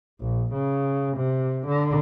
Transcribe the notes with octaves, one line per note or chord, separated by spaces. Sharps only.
A#1
C#3
C3
D3